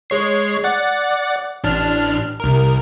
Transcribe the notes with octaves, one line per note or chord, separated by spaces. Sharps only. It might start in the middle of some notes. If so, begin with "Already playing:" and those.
G#3 C#5 C7
D5 F#5
A1 D4 F6
C2 A#4